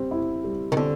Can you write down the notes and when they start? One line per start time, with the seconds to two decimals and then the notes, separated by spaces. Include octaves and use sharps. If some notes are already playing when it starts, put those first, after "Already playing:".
Already playing: G3 C4
0.11 E4
0.44 G3
0.72 D#3
0.77 D3 C4